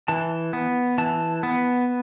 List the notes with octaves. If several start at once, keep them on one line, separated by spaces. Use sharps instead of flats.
E3 A5
B3
E3 A5
B3